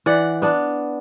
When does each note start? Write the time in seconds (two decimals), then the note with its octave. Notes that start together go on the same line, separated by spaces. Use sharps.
0.06 E3 D5 F#5
0.42 B3 D4